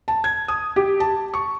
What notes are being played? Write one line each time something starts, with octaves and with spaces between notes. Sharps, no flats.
A5
G#6
D#6
G4
A5
C#6